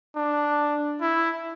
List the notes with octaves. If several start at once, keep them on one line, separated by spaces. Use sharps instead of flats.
D4
E4